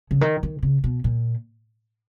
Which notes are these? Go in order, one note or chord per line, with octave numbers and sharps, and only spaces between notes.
C#3
D#3
D#3
C#3
B2
A#2